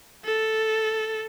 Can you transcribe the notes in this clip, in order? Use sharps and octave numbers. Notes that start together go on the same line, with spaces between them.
A4